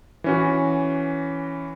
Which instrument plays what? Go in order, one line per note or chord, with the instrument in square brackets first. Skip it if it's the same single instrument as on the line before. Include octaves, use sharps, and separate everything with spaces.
[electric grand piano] E3 C#4 F#4